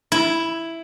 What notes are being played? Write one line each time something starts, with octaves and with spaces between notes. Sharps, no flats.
E4